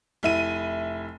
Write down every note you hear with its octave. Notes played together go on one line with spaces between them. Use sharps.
F1 E4 D#7